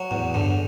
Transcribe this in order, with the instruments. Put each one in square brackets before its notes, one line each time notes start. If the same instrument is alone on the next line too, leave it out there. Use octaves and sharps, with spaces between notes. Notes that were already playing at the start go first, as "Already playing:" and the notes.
Already playing: [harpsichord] F#3
[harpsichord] E2 [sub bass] A2
[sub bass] G2 [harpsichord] D3